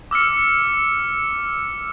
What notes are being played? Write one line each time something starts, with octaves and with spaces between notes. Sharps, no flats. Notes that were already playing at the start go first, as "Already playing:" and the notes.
D6 E6 F6 C#7